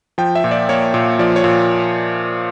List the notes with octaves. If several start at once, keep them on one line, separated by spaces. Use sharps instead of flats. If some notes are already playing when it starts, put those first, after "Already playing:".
F3 G5
E5
A#2
D5
A#3 C#5
A#2
F3 D5
C#5
A#2